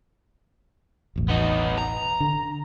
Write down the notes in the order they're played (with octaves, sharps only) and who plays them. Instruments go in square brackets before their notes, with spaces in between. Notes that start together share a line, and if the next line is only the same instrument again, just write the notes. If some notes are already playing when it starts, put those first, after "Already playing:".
[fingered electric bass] E1 A1
[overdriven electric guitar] B3 D#4
A#5
[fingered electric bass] D3